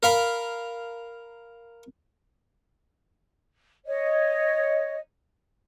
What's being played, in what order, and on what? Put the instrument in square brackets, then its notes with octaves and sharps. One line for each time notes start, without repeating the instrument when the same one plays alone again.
[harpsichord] A#4 F5 B5
[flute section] C#5 D#5